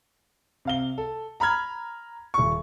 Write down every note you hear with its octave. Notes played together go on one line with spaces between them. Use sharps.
C3 F5 G7
A4
A#5 B5 F6 G#6
D#1 C#6